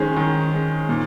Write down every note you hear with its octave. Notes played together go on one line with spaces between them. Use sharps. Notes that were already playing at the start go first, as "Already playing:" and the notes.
Already playing: D#3 G#3 C#4 C5
D#3
G#3 C#4
A#2